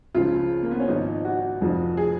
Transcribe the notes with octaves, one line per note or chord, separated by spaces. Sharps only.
C#2 C#3 F3 F4
A#3
B3
C#4
G#1 G#2 F3 D#4
D#4
F#4
F1 F2 F3
G#4